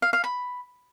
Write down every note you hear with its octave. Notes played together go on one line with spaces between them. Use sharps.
F5
F5
B5